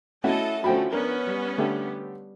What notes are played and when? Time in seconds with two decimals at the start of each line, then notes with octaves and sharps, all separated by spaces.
0.24 A3 C#4 E4 F#4 A4 D#5 A5
0.64 D3 F3 A3 C#4 F#4 C5 G5 B5
0.92 B3 C#4 D4 A#4
1.27 G3
1.58 D3 A3 G4